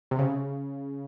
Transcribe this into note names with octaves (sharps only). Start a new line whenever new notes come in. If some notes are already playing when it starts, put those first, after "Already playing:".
C3
C#3